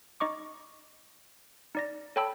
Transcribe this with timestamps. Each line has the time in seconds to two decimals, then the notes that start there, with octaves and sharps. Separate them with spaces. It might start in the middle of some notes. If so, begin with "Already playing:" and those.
0.20 D#4 D#5 C#6 D6
1.75 D#4 D5 A#6
2.16 A4 C#5 G5 A5 B5 E6